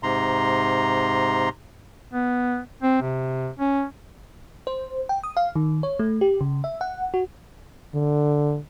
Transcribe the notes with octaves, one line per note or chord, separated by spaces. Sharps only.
G#2 C3 A#5 C6
B3
C4
C3
C#4
C5
G5
D#6
F5
D#3
C#5
A3
G4
C#3
E5
F#5
F#4
D3